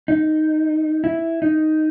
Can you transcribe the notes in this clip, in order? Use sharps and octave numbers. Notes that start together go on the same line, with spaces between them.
D#4
E4
D#4